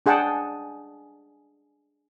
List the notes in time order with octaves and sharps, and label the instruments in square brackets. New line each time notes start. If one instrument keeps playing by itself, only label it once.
[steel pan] D4 G#4 F#5 G5 A5